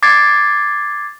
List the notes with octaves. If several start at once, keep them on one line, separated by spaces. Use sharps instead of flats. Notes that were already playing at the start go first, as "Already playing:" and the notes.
D6 G#6 A6 C7